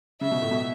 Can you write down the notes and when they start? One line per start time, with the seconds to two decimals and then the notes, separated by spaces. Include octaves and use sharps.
0.21 C#3 E5
0.31 B2
0.42 A2
0.51 B2